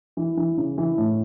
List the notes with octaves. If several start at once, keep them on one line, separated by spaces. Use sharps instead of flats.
E3
E3
C#3
E3
A2